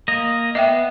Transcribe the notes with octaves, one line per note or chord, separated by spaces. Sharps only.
A#3 D#5
B3 D#5 E5 G5